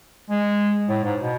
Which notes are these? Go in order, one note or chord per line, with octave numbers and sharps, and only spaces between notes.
G#3
A2
G#2
B2